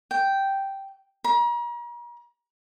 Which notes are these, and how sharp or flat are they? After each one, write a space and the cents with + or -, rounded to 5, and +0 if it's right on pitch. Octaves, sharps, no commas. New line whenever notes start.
G5 -5
A#5 +40